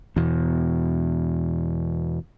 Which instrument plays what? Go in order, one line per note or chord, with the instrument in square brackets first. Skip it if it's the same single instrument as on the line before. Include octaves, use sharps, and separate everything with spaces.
[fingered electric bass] E2 B2